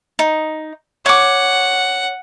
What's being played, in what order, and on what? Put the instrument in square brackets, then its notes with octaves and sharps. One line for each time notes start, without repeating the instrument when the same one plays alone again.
[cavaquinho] D#4
[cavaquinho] C#5 D6 [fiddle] F#5